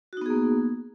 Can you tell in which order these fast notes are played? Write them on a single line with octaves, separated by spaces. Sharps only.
F#4 D#4 B3 G#4 A#3